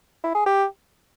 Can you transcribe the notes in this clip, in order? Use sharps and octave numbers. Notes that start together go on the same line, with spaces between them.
E4
G#4
G4